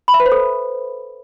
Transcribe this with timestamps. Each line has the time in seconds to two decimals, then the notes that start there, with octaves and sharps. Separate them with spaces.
0.08 B5
0.14 E5
0.20 B4
0.26 C5
0.32 A4